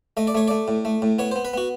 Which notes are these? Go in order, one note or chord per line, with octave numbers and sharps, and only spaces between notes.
A3 D#5
D5
A3 C#5
A3 D5
A2
A3
A2
B3 C#5
C5
B3
B4
B3 F#4